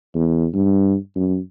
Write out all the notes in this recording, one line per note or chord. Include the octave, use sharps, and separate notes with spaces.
E2
G2
F#2